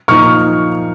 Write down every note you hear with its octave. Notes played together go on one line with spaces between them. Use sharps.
A#2 F3 A#3 D#4 C#6 F6